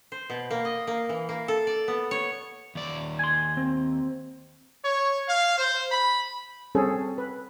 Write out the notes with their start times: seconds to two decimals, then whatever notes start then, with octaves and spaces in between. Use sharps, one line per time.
0.12 C5
0.30 B2
0.51 A#3
0.65 D#5
0.87 A#3
1.09 E3
1.29 A#3
1.48 A4
1.67 D5
1.88 B3
2.11 C#5
2.75 D#2 D5
3.19 G#5 C6
3.57 C4
4.84 C#5
5.27 F5
5.58 C5
5.91 B5
6.75 G3 C4 C#4 G#4 A4
7.18 B4